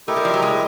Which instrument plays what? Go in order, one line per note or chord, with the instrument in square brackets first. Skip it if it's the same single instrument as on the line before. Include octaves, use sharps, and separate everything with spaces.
[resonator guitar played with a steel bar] A3 [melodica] E4 G4 A#4 D#5
[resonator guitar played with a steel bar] G3
F3
F#3
G#3